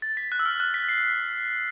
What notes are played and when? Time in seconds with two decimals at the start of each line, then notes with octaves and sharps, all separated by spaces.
0.02 A6
0.17 B6
0.32 F#6
0.39 E6
0.45 F6
0.60 F#6
0.74 B6
0.88 C7